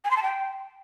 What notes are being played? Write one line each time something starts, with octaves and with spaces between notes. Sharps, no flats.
G#5
C6
A5
G5